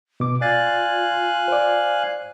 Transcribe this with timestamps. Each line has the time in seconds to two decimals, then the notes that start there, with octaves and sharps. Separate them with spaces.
0.20 B2 D6
0.41 F4 D5 F5 G#5 F#6 A6
1.48 C5 D5